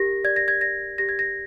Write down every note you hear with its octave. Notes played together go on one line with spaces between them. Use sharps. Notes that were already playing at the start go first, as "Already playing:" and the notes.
Already playing: G4 A#4 A#6
D5 G#6
A#6
G#6
D5 A#6
G4 A#6
G#6
A#6